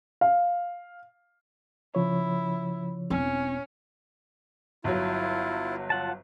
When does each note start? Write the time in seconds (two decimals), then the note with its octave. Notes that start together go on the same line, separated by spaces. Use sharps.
0.21 F5
1.95 C#3 F3 E4 C#5
3.10 E1 C4 C#4
4.84 G1 F#3 E4 F4
5.90 F4 F#5 A5